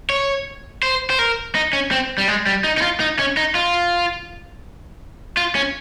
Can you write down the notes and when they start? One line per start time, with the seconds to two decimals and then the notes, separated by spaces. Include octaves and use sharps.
0.10 C#5
0.83 C5
1.10 C5
1.19 A#4
1.55 D#4
1.73 C#4
1.91 C4
2.18 G3
2.28 G#3
2.46 G3
2.64 D#4
2.77 D#4
2.82 F4
3.00 D#4
3.19 C#4
3.37 D#4
3.55 F4
5.37 F4
5.55 C#4